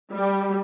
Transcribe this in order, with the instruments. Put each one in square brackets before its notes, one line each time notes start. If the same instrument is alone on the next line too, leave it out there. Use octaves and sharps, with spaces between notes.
[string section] G3